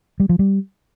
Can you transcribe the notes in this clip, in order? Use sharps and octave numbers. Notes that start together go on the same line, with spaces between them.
G3
F3
G3